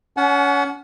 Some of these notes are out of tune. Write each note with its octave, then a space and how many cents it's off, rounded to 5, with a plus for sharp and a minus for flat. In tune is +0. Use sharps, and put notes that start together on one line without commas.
C#4 +30 F#5 +0 A5 -45